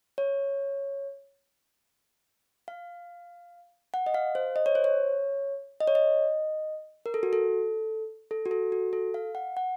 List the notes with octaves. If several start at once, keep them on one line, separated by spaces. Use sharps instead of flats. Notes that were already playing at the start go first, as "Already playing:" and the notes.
C#5
F5
F#5
D#5
F5
C5
D#5
C#5
C5
C#5
D#5
C#5
D#5
A#4
A4
F#4
A4
A4
F#4
A4
F#4
A4
F5
F#5
F#5